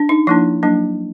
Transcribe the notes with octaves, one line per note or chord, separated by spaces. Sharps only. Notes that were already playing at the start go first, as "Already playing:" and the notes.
Already playing: D4
D#4
F3 A#3 D4 E4
F#3 A#3 D4